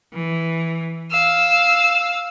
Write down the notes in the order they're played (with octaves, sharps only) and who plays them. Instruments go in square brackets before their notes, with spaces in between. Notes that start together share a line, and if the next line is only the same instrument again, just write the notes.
[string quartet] E3
F5 E6